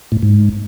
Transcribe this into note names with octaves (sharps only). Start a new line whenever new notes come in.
A2
G#2